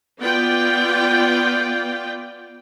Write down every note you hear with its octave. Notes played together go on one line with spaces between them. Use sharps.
B3 F4 D5 G5